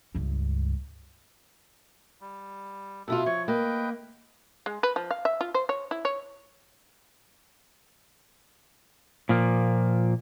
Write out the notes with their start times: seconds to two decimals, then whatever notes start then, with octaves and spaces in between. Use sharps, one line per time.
0.15 C#2 G2
2.21 G3
3.08 B2 E4 F4 A4
3.26 F3 C#5 C#6
3.48 A#3 B4 D#5 G5
4.66 G#3
4.83 B4
4.96 F3
5.11 F5
5.25 E5
5.41 F4
5.54 C5
5.69 C#5
5.91 E4
6.05 C#5
9.29 A#2 F3 A#3